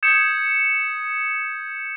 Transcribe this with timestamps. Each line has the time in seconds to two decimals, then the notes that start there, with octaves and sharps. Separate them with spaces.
0.03 D#6 G6 G#6 C#7 E7